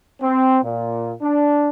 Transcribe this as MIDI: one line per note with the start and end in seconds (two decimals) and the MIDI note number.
0.21 0.58 60
0.63 1.13 46
1.22 1.70 62